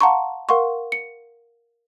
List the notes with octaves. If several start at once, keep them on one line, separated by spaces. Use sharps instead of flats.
F5 F#5 A5 A#5 C6 C#6
A#4 F5 F#5 C6 C#6
C#7